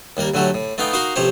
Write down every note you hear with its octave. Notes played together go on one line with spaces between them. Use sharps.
D#2 G3 A#3 A#4
A2 D3 F#3 A3 F#4 G4
A2
A3 B3 D#4 F5 G5
D#4 F#4 A#4 F5 A#5 C6
A1 C3 F3 G4 C5 C#5